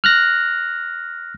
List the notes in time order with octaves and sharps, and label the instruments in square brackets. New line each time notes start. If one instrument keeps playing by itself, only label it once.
[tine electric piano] F6 F#6 A#6